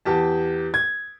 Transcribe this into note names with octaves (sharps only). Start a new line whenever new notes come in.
E2 G4 A5
G#6